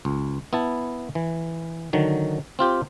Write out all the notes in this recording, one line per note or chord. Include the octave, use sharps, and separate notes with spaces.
C#2
B3 E4 A5
E3
D3 D#3 F#3
C4 F4 G4